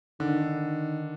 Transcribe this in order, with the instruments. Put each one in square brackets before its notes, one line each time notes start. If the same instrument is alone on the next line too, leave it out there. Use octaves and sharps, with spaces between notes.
[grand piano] D3 [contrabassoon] D#3